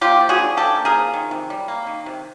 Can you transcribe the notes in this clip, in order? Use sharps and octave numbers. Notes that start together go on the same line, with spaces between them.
A#3 F4 G4
F3
F#4 G#4
D4
F3 G4 A4
A#3
G#4 A#4
F3
D#3
C3
G3
A#3
D#3
C3